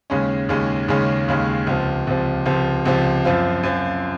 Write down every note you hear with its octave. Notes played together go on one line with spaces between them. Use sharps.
D#2 C#3 G#3 C#4
D#2 C#3 G#3 C#4
D#2 C#3 G#3 C#4
D#2 C#3 G#3 C#4
C#2 C3 F3
C#2 C3 F3
C#2 C3 F3
C#2 C3 F3
F#2 F3 C4 F4
F#2 F3 C4 F4